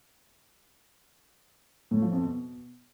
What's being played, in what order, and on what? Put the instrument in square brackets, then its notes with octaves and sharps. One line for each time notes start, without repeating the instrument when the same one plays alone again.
[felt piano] A2
F3
F2
B2